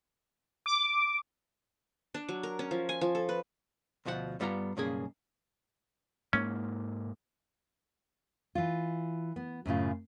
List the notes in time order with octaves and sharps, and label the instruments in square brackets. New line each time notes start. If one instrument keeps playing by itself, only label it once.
[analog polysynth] D6
[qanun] D4
F#3
A#4
C#4
F3
G#5
F3
A4
B4
[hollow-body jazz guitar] D2 B2 F3 F#4 F#5
G2 G3 B3 F4 E5 A#5
B1 G2 C#3 A#3 G#4 G#5
[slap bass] G#2 A#3 [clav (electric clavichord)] C#4
[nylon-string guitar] E3 F4
B3
F#2 A2 C#3 F4